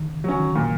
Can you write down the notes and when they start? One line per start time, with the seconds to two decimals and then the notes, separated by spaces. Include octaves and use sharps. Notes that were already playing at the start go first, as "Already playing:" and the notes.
Already playing: D#3
0.09 C#3
0.24 C#3 F#3 C#4
0.40 D#3
0.55 A#2 F#3